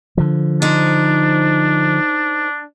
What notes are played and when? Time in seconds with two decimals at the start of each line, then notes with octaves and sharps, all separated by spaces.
0.17 D3 F3
0.62 D4 D#4 C5